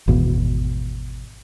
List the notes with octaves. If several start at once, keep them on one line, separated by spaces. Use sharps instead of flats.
G#1 E2 B2